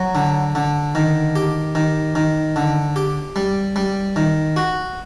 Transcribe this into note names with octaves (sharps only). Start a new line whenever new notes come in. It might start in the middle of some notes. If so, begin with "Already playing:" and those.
Already playing: F#3
D3
D3
D#3
G4
D#3
D#3
D3
G4
G3
G3
D#3
F#4